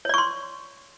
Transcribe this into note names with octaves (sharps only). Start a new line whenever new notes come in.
C#5 D5 C6 C#6